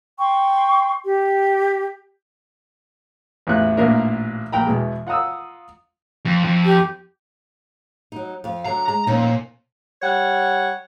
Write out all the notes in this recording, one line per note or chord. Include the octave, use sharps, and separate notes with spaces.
G5 C6 C#6
G4
A1 E2 F4 F#6
A1 A#2 A#3 D4 A#4
A#1 G5 A#5 B5
E2 B2 G#3
F4 F#5 A#5 D#6 E6
F2
F2
G4
F#3 D#4
F2 F5
D3 F#3 A#5
G#3 A#5
F2 A#2 C#4 D#4
G3 C#5 F#5